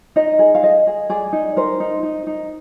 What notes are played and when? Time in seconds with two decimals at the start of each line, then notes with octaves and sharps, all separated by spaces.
0.16 D#4 D#5
0.39 G#4
0.55 F5
0.63 G#4 D#5
0.87 G#4
1.10 G#4 D5
1.33 D#4
1.57 A#4 C5
1.80 D#4
2.03 D#4
2.27 D#4